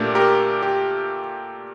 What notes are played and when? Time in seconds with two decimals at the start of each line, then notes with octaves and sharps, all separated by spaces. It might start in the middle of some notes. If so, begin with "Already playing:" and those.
Already playing: A#2 A3 D4 G4 A#4
0.15 G4 A#4
0.62 G4